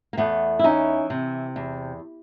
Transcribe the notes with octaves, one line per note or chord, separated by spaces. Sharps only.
A#3
E2 A3 B3
E4
E3 C#4 D#4
C3
E2